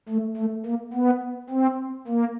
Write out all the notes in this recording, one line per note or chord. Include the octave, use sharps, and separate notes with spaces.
A3
A3
A#3
B3
C4
A#3